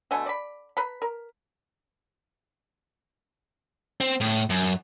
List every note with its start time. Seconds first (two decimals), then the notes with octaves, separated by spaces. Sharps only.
0.11 B2 D3 A3 G#5
0.26 D5 B5
0.77 B4 A#5 B5
1.02 A#4
4.00 C4
4.20 A2
4.50 F#2